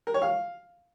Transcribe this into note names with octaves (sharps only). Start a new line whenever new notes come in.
A#4
C#5
F5